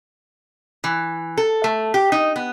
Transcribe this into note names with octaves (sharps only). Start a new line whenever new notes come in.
E3
A4
A3
G4
D#4
B3